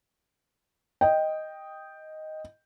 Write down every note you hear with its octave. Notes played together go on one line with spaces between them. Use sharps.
D#5 G5